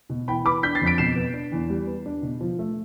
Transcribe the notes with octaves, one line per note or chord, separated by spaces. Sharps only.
B2
E3 G5 B5
B3 B5 D6
D4 G6 B6
A6 C7
F2
B6 D7
B2 C7 E7
B3
D4
E2
G3
B3
D4
B2
F3
A3